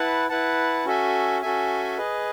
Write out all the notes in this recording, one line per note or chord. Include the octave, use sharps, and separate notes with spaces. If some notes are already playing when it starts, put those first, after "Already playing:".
Already playing: E4 B4 F#5 A5
E4 B4 F#5 A5
C#4 F#4 A4 E5 G#5
C#4 F#4 A4 E5 G#5
G#4 B4 D#5